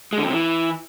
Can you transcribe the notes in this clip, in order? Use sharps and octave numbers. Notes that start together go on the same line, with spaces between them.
G#3
D3
F2
C3
E3